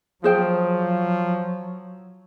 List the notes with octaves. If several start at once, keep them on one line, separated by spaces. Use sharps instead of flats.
F3 F#3 G#4 C5 G5